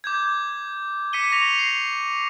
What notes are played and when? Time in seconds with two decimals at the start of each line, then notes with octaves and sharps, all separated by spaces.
0.04 D6 G6 G#6
1.13 D6 B6 C#7 D#7 G7
1.32 C#6 A#6 B6 F7
1.59 C7